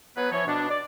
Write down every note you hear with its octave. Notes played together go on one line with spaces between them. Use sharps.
F#3 B3 G#4 B4
E3 F3 C#5
B2 D4
D5